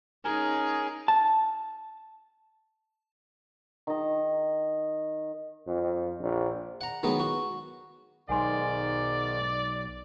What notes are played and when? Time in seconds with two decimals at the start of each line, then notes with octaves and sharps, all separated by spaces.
0.25 C#4 D#4 G#4 A#4 G#5
1.08 A5
3.87 D#3 D#5
5.67 F2
6.20 A#1
6.81 F#5 A#5
7.03 D#3 F#3 G#3 B3
7.20 F#4
8.29 B1 G#2 D#3 D5 F#5 G#5 C6